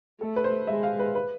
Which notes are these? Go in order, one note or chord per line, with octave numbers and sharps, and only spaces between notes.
A3 A4
B4
C5
G#3 E5
F5
B4
B4